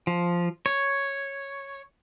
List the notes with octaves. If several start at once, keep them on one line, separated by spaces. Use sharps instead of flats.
F3
C#5